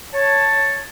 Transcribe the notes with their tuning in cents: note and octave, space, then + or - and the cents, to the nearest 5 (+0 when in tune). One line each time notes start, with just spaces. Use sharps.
C#5 +0 A5 +5